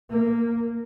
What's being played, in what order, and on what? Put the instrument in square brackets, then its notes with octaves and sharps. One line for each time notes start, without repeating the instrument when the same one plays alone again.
[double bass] A#3